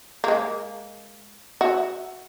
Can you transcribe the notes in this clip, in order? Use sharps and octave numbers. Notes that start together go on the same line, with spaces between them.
G#3 A#3
F#4 E5